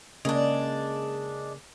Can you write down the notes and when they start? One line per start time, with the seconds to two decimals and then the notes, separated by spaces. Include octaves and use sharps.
0.25 C#3 G#3 A#3 D4